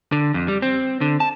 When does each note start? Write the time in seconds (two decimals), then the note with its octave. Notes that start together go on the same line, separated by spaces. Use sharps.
0.12 D3
0.34 F2
0.48 G3
0.62 C4
1.01 D3
1.20 A5